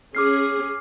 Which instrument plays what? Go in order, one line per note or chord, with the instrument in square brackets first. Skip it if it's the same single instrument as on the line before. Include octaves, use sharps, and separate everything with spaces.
[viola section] C#4 G#4 [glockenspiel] D6 F6 C7